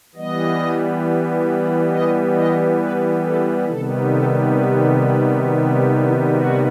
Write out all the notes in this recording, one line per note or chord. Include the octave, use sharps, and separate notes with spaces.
E3 G3 B3 D#5
D#5
D#5
B4
A4
C3 D#3 G3 B3 A4
A4
B4
A4
G4
F#4
G4
E4
F#4